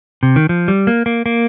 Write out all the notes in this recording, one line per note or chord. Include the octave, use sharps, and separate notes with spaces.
C3
D#3
F3
G3
A#3
A#3
A#3